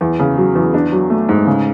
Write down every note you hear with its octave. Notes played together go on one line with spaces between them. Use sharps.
E2
C#3
F#3
E2
D4
F#3
A3
G#2
C#3